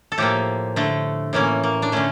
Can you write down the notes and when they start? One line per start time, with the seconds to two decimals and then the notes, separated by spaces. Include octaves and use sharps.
0.12 A4
0.18 A2 F3 A#3 G4
0.76 D3 A3
1.33 A2 E3 A#3 C#4
1.63 A#3
1.82 D4
1.92 D3 A3 C#4